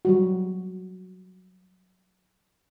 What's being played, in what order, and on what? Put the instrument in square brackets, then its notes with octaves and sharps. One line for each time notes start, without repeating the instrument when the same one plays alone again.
[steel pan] F#3 G3 F#4